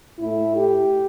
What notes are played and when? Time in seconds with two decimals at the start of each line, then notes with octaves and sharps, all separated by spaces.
0.19 A2 A3 E4
0.55 G4